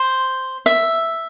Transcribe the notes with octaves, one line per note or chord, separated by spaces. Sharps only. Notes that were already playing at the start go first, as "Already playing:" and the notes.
Already playing: C5
E5